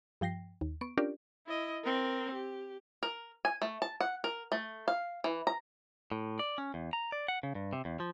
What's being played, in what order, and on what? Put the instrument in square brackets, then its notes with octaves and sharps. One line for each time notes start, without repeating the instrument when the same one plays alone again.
[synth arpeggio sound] G2 F3 G5 A#6 C7
D#2
B3 C#6 D7
C#4 D4 F4 G4 A#4 D5
[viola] E4 D#5
C4 A#4
G4
[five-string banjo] A#4
G#5
A3
A5
F#5
A#4
A3
F5
E3
A#5
[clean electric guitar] A2
D5
C#4
E2
A#5
D5
F#5
C#3
G2
C3
E2
F3